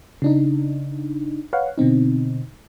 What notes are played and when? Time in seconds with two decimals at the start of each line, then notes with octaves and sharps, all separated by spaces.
0.22 C#3 D4 D#4
1.53 B4 C#5 F5 F#5
1.78 B2 D3 C4 D#4